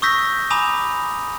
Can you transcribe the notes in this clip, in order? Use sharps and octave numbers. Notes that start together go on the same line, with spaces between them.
C#6 D#6 E6 G6 A#6 B6
G#5 A#5 B5 D6 D#6 F7